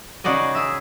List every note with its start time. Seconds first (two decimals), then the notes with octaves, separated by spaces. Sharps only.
0.24 C#3 D#4 F#4 G#4 D5 D#5
0.55 G#4 E5